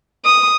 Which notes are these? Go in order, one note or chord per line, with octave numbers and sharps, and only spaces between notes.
D#6